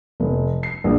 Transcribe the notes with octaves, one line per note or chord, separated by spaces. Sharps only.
F1
C7
A#1